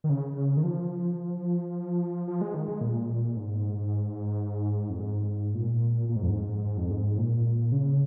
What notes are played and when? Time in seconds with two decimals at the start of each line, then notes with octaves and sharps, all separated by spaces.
0.04 D#3
0.09 C#3
0.57 D#3
0.64 F3
2.27 F3
2.41 G#3
2.54 D#3
2.68 G#3
2.81 A#2
3.37 G#2
4.90 F2
5.01 G#2
5.55 A#2
6.09 A#2
6.16 G#2
6.23 F2
6.30 G#2
6.64 G#2
6.77 F2
6.91 G#2
7.18 A#2
7.72 C#3